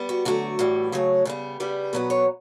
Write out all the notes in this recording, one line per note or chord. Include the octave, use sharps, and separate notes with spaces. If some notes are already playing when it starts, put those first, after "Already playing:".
Already playing: G3 B3
F#4
D3 F#3 A3 F#4
A2 E3 G3
C#3 F#3 A3 C#5
C#3 G3 B3
C#3 G3 B3
B2 F#3 B3 B4
C#5